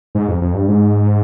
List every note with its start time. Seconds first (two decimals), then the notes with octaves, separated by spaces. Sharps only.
0.15 G#2
0.28 F2
0.41 F2
0.54 G2
0.68 G#2